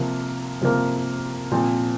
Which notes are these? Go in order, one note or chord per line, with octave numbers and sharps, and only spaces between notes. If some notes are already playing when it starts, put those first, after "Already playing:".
Already playing: C3 F3 A#3
C3 F3 A#3
A#2 F3 C4